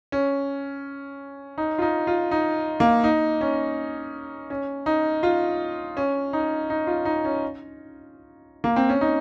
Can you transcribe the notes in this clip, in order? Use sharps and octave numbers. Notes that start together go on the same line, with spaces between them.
C#4
D#4
F4
D#4
F4
D#4
A#3
D#4
C#4
C#4
D#4
F4
C#4
D#4
D#4
F4
D#4
C#4
A#3
C4
C#4
D#4